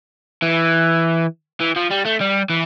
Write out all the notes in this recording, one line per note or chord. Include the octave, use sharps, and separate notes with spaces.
E3
E3
F3
G3
A3
G3
E3